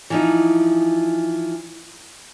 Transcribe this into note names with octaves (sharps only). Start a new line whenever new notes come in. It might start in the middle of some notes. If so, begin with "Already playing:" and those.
E3 F3 D#4